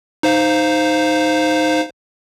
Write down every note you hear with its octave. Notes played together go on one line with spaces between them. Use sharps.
D#4 C5 F5